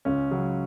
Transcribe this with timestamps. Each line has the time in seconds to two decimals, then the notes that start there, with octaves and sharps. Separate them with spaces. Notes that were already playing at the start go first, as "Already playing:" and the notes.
0.05 C#2 C#4
0.31 C#3 F#3